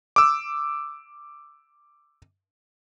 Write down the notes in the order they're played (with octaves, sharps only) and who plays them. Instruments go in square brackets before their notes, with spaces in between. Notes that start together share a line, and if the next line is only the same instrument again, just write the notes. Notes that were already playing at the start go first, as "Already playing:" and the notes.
[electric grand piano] D6 E6